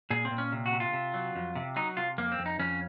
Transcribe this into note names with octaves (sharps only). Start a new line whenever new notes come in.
A#2 G#4
C4
A#2
C#4
C3
F#4
C3
F4
C3
F#3
F2
C3
F#3 D#4
C3 F4
F2 A#3
C4
F2
D#4
F2 C#4